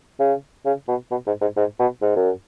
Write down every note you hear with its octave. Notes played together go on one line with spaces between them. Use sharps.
C#3
C#3
B2
B2
G#2
G#2
G#2
B2
G#2
F#2